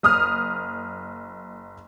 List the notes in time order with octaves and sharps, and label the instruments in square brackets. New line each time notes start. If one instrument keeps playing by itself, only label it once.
[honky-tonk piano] F#1 D#6 F6